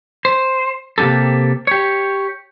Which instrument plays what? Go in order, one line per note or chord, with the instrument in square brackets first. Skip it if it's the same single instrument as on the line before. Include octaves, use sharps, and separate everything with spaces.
[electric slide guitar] C5
C3 A#3 C#4 G4 A4
G4 C#5